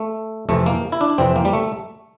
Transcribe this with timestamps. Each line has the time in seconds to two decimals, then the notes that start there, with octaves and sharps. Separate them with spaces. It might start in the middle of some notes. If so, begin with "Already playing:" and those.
Already playing: A3
0.49 F2 C3 E3 A3
0.66 A#3
0.92 E4
1.01 D4
1.18 F2 C3 E3 C4
1.36 A#3
1.45 G3
1.53 A3